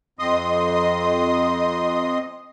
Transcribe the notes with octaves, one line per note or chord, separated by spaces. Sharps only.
F2 D#5 C6 D#6